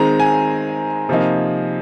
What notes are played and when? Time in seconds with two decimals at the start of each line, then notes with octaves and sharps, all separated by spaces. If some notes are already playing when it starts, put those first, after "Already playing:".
Already playing: D#3 G#3 C4 D#4 A#5
0.20 G#5
1.09 C3 F3 A#3 D#4